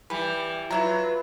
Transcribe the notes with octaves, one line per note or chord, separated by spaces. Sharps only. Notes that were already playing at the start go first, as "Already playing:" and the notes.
E3 G3 B4
F#3 E4 F4 B4 E5 A#5 B5